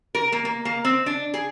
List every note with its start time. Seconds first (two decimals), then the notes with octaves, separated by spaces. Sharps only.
0.15 A#4
0.32 A#3
0.45 A#3
0.65 A#3
0.85 C4
1.06 D4
1.34 G#4